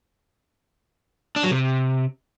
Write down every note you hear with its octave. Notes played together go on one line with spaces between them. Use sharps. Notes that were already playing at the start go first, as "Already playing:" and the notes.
D4
F#3
C3